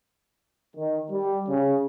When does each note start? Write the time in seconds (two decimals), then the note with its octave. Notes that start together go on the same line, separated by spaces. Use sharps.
0.75 D#3
1.11 G3
1.48 C#3